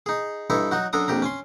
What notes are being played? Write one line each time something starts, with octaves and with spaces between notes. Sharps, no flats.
D#4 G#4
G2 D#4 E4 A4 C#5
F#3 D#4 F#4
F#2 D4 A4 A#5 D#6
A#1 F2 G4 A#5
C#4 G#5 C6